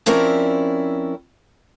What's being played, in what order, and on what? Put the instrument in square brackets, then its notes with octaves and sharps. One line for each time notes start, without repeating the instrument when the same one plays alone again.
[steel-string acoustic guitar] F3 C4 C#4 E4 A#4 D5